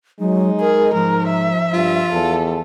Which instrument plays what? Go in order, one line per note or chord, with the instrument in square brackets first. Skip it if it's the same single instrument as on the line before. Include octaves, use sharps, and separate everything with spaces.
[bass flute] F#3 [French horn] G#3 [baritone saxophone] D#4
[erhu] G#4 [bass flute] A#4
[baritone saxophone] G#2 [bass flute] F3 [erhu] A#4
[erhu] E5
[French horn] G2 [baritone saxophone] F4
[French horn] E2 [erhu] A4